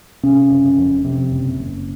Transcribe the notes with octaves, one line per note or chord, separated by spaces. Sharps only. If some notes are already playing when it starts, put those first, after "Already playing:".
C3 C#4
F#1
F2
C3
F#1
F#1